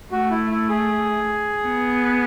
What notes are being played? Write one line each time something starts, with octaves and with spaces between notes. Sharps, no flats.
A3 F#4
E4
E4
G#4
B3